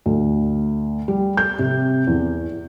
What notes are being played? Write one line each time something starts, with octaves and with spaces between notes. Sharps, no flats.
D2
G3
G6
C3
E2